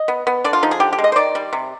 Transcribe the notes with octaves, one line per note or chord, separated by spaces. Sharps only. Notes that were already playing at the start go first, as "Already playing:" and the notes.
Already playing: D#5
B3
B3
D3 D5
F4
F3 D#4
G#4
D3 G4
G4
G#3
D#5
C5
D#3 D5
G3
C3